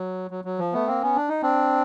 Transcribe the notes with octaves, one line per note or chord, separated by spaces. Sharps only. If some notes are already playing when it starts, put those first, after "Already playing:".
Already playing: F#3
F#3
F#3
F3
A3 B3
A#3 C4
B3 C#4
D4
D#4
C4 D4